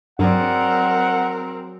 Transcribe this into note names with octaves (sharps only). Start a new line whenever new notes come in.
G2 F#3 C4 G#4 A#4 D5 F#5